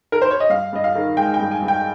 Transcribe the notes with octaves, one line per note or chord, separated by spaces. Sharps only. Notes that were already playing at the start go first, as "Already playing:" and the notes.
A#4
C5
C#5
D#5
G2 F5
G2 D#5
F5
D#3
G#3 G5
G5
G2
G#5
G2
G5